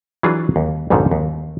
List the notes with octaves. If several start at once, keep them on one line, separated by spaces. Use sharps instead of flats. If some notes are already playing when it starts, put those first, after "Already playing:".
E3 F#3 D4 F4 G#4
D#2
B1 F2 G#2 D3 D#3
D#2